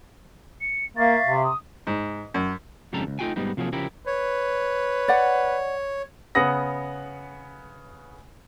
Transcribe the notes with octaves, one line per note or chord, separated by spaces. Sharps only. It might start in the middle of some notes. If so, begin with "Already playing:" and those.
C#7
A#3 E5 F5 C#6 A6
C3
D#6
G#2
F#2
F2 G#2 C#3 G3 A4 A#5
C#2
A3 D#4 F4 F#4 G5 G#5
G#2 G3 B3 D#4
C3 F3 F#3 A#3 G#4
C#3 F3 E4 G4 A#4
B4 C#5
D5 F#5
C#3 B3 F#5 D#6 A#6